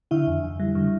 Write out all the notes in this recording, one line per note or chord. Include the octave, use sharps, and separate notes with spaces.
D3 E4 E5
F2
F2
G3
D3